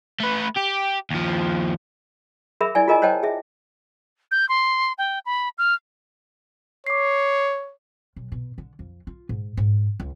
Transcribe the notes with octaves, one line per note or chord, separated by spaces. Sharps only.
A3 B4
G4
D#2 F3
G#4 A#4 E5 B5
E4 D5 G#5
F4 G#4 A#4 D#5 G#5 A#5
C5 C#5 D#5 G5 A5
G#4 E5
G6
C6
G5
B5
F6
C#5 D6 C7
B1
B2
D3
F2
F4
G#2
G#2
C#2